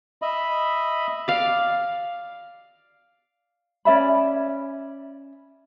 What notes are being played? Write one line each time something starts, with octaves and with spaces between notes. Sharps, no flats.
D#5 E5 B5
D5 F5
C#4 D5 E5 B5